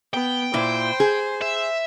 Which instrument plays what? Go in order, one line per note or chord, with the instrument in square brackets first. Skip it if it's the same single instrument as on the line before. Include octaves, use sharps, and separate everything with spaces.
[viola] B3 [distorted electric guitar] G5
[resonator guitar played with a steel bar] A#2 E4 [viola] C5
[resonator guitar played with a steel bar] G#4
[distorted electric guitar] E5